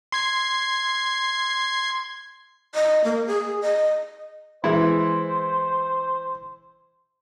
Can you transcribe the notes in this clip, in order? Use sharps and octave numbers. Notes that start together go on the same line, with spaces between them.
C6 G#6 C7
D#5
A#3
G#4
D#5
E3 G#3 E4 C5